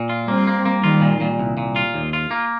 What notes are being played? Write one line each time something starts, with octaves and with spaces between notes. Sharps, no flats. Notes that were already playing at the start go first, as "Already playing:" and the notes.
Already playing: A#2
F4
G3 A#3 C4
A#3
A#3
D#3 G3 F4
A#2
A#2
C2
A#2
F4
D#2
F4
A#3